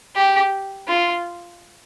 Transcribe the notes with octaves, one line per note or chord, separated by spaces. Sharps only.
G4
F4